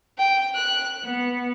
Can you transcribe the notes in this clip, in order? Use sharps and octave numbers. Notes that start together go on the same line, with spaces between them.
G5
F#6
B3